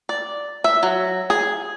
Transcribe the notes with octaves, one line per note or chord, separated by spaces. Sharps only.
D5
E5
F#3
G#4